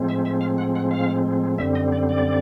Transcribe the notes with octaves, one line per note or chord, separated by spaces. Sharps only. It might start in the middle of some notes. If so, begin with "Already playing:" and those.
Already playing: A2 F3 G#3 C4
E5
E5
F5
F#5
F#5
F5
F#2 D3 G3 C4 E5
D#5
D5
D5